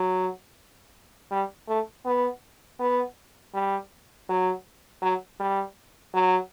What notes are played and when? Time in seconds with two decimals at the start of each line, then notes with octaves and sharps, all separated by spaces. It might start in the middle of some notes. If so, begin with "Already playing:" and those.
Already playing: F#3
1.31 G3
1.68 A3
2.06 B3
2.79 B3
3.54 G3
4.29 F#3
5.02 F#3
5.40 G3
6.14 F#3